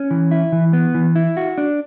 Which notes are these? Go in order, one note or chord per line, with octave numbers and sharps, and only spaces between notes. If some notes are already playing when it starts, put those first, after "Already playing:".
Already playing: C#4
E3
E4
E3
B3
E3
E4
F#4
D4